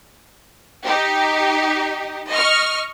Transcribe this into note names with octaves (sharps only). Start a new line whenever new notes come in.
D#4 G4
D#5 C#6 F6